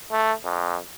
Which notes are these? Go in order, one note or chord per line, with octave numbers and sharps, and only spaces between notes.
A3
F2